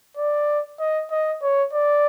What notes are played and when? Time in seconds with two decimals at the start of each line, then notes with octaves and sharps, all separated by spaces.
0.17 D5
0.79 D#5
1.10 D#5
1.42 C#5
1.73 D5